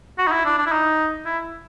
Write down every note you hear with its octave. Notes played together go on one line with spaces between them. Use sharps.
F#4
D#4
E4
D4
D4
E4
D#4
E4